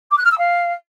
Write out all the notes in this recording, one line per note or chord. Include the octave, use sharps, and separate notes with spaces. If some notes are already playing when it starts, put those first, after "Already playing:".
D6
F#6
F6
E6
F5